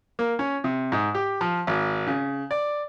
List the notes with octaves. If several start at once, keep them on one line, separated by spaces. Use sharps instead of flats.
A#3
C#4
C3
G#2
G4
F3
G#1
C#3
D5